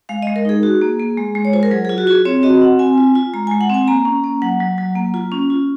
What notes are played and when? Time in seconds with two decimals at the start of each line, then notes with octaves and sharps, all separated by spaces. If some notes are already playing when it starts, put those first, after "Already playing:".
0.09 G#3 F5
0.22 G#3 D#5
0.36 A#4
0.45 D#4 G#4
0.63 F#4
0.81 A#3
1.00 A#3
1.18 G#3
1.35 G#3
1.45 C#5
1.53 F4 C5
1.63 A#4
1.71 F#3 G#4
1.85 F4 G#4
1.98 F#4
2.07 F4 G#4
2.25 C4 C#5
2.43 F#4 D#5
2.61 C4 F#5
2.79 C4 G#5
2.98 F4
3.15 F4
3.34 G#3 A#5
3.47 G#3 G#5
3.61 F#5
3.69 C4 G#5
3.88 A#3 A#5
4.05 C#4
4.24 A#3
4.42 F#3 F#5
4.60 F#3
4.78 F#3
4.96 A#3
5.14 F4
5.32 C#4
5.50 F4